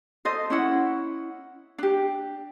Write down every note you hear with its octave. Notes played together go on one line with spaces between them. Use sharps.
A4 C5 D#5
C#4 E4 F#5
D4 G4